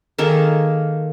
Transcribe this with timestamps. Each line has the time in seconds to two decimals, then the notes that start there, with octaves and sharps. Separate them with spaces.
0.18 D#3 A#3 G#4 A4